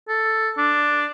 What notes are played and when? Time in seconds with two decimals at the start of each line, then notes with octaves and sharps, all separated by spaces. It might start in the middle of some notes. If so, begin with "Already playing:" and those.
0.08 A4
0.58 D4